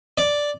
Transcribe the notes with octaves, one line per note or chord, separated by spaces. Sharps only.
D5